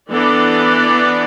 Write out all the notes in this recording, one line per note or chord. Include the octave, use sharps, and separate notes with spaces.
E3 B3 D4 A4 D5